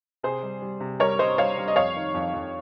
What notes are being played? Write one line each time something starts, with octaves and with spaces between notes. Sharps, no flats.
C3 G#4 C5
G3
G3
C3
G3 A#4 C#5
G3 C5 D#5
G3 C#5 F5
G3
D#5
F2 C#5 F5
D#3
F2
F2